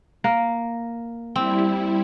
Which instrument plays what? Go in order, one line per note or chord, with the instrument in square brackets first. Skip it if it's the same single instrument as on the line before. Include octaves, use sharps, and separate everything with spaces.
[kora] A#3
[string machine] G3 E4 [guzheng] C4